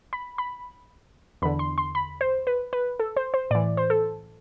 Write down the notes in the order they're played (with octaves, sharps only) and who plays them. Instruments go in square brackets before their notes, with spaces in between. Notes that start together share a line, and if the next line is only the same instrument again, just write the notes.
[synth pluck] B5
B5
E2 D3 B5
C6
C6
B5
C5
B4
B4
A4
C5
C5
A2 D5
E3
C5
A4